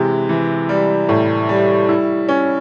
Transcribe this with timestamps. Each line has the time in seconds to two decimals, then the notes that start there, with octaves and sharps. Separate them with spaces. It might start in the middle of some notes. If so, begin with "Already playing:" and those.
Already playing: C3 E3 G#3
0.29 E3
0.69 G3
1.09 A2
1.49 G3
1.89 E4
2.29 C#4